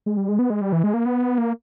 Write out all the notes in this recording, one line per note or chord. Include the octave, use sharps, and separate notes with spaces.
G#3
G3
G#3
B3
G#3
G3
E3
G#3
A#3
B3
A#3